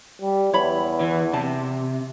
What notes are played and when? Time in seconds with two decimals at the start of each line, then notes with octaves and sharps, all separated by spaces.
0.22 G3
0.53 E2 C#5 B5
1.00 E3
1.33 C3 A5